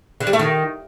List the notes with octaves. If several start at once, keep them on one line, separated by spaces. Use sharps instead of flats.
D3
G3
A3
D#3